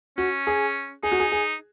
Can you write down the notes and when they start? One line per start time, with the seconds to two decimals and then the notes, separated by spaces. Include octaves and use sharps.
0.18 C#4 F#4
0.47 G#4
1.03 D#4 G#4
1.12 F#4
1.20 G#4
1.32 G#4